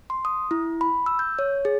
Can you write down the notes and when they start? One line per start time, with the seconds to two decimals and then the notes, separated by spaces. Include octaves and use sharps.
0.10 C6
0.25 D#6
0.51 E4
0.81 B5
1.06 E6
1.19 G6
1.39 C#5
1.65 G#4